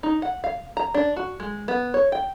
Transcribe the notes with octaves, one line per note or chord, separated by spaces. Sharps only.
D#4
F#5
F5
A#5
D4
F#4
G#3
B3
C#5
G5